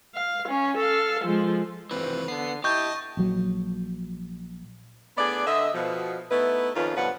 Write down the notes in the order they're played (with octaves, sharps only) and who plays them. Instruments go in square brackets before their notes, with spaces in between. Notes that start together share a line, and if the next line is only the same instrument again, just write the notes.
[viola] F5
C#4
A4 F5
F3 G#3
[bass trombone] F1 [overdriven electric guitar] E3 C4 [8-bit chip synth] B4
[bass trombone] D3 [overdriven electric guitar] B3 [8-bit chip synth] C7
[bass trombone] E4 [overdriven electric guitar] G4 [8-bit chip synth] D#5 A5 [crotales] C#6 G6
[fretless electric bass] A#1 F#3
[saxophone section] A2 B3 D4 G#4 D5
D3 D#5 E5
B2 F3
A3 B3 D#4 E4 B4
F2 D#3 F3 C#4 F4 B4
G2 B2 F3 F#3 B4 F#5